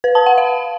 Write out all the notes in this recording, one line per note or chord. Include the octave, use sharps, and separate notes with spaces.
B4
A5
F#5
F5